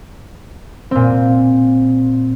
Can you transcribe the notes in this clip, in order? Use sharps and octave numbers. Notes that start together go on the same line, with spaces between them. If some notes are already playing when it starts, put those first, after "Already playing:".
A#2 C4